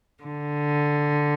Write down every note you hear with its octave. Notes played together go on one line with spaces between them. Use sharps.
D3